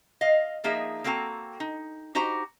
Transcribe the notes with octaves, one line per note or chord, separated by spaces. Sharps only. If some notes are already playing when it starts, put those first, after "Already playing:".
D#5 F5
F3 A#3 D#4 G#4 E5
A#3 C4 F#4 A4 G5 A#5
D#4
D#4 F#4 G4 C5 A#5